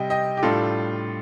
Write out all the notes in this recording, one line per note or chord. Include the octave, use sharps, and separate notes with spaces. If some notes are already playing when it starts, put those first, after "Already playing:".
Already playing: C3 G3 D#5 G5
D#5 G5
G4
A2 G3 D4 F4 A4